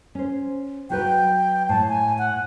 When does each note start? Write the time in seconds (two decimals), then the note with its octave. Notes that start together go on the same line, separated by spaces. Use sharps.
0.15 C#4 C5
0.90 F#3 F#4 B4 G5
1.69 A2 A5
1.88 G#5
2.18 F#5